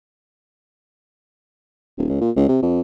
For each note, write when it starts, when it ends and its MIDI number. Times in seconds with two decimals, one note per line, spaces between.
1.98 2.06 27
2.09 2.20 37
2.21 2.31 46
2.36 2.46 37
2.48 2.60 48
2.62 2.81 41